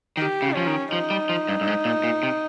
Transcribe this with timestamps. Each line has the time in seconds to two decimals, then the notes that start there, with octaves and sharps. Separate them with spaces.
0.17 D#3 G4
0.42 C#3
0.54 F3 C#4
0.67 D#3
0.92 F3 D#4
1.10 G3
1.29 F3
1.49 G2
1.61 G2
1.67 G#2
1.85 A#2
2.04 A#2
2.23 C3